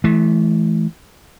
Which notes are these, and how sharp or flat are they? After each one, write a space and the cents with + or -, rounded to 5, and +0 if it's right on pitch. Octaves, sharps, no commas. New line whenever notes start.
E3 +0 A3 -35